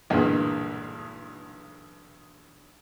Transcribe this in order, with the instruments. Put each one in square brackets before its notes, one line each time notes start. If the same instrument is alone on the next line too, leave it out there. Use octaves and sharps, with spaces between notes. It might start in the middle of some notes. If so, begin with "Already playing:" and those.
[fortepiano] B1 E2 G2 A#2 D3 G#3